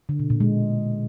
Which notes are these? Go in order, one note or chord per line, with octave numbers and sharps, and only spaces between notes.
D3
B2
A#2
G#3